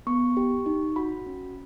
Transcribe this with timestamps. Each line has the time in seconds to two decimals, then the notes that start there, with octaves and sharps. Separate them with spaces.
0.07 B3 C#6
0.37 G4
0.66 D#4
0.96 F#4 B5
1.26 C#4